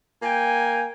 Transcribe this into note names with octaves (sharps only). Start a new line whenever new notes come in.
A#3 G5 G#5